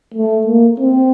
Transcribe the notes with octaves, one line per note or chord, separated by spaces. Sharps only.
A3
A#3
C4